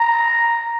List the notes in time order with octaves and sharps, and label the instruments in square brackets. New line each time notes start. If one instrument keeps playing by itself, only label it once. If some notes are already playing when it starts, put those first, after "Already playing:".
Already playing: [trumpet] A#5